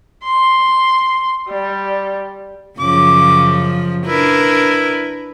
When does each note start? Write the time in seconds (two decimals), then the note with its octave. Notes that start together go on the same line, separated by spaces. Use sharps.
0.24 C6
1.49 G3
2.79 F#2 C#3 F3 D6
4.07 D4 E4 A#4 B4